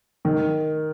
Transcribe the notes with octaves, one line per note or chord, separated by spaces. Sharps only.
D#3